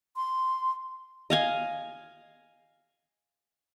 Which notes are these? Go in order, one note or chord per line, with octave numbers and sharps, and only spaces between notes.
C6
D#5 F5 G#5